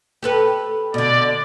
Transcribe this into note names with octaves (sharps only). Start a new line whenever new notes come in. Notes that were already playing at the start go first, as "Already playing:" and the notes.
G4 A4 B4
B2 D3 D5